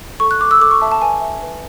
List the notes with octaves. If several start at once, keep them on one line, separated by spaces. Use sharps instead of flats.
A4 C#6
F#6
A4 D6
E6
A4 D6
C#6
E5 A5
A5
B4 G#5
E5
B4